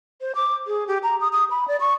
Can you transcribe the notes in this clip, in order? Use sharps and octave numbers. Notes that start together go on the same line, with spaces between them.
C5
D6
G#4
G4
A#5
D#6
D#6
B5
D5
C#6